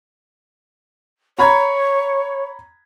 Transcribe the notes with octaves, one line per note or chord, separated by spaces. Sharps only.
C#5 A#5 B5 G#6